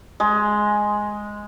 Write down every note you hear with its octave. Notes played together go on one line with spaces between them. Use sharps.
G#3